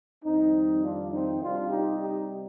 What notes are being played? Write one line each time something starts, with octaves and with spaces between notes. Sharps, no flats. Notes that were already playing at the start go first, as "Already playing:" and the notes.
F2 D#3 G3 C4 D#4
D4 F4
C4 D#4
C3 G3 D4 F4
D#4 G4
D#4 G4